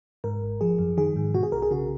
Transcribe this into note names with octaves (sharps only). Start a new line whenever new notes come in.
G#2 A#4
G#1
F3 G#4
F#2
D#3 G#4
G#2
B2 F#4
G#4
B1 A#4
G#4
C#3 F#4